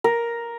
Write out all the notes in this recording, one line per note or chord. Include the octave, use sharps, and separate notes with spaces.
A#4